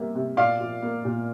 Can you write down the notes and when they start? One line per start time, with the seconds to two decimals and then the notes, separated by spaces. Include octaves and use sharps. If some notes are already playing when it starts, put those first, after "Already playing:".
Already playing: C3 G3 A#3
0.15 C3
0.37 A#2 D5 F5
0.60 F3
0.82 A#3
1.05 A#2